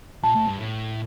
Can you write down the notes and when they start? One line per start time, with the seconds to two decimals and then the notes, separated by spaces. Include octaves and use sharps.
0.23 A#2 A5
0.35 A2
0.46 G2
0.59 A2